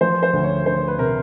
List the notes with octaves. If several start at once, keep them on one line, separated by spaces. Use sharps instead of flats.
F3 C5
C5
D2
C#5
D2 C5
B4
C3 A#4